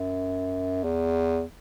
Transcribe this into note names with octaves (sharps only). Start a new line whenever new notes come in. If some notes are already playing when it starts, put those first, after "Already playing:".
Already playing: F#2
E2